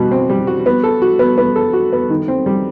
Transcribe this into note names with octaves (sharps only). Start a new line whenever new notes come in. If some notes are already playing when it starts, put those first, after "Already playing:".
Already playing: B2 G3 F#4
C4
G3
F#4
B3
A4
F#4
B3
B3
A4
F#4
B3
D#3
C4
G3